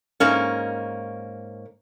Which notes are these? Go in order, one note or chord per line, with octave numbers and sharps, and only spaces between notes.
G#2 A#3 C#4